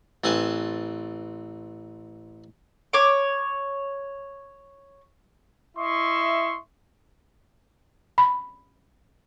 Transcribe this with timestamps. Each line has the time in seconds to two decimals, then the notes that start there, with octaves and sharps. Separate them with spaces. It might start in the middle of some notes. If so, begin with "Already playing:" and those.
0.24 A1 C4 A4 B4 G#5 A5
2.93 C#5 D6
5.77 E4 D#5 E5 C6 C#6
8.18 B5